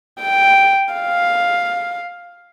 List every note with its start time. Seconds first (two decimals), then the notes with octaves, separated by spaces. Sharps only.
0.20 G5
0.94 F5